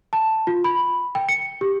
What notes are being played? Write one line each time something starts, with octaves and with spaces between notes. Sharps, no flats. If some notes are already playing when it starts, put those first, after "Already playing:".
A5
F4
B5
G5
C#7
G4